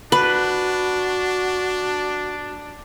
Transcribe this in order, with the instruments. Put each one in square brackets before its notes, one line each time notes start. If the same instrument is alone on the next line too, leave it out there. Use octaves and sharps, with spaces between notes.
[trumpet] D4 [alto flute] F#4 [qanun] B4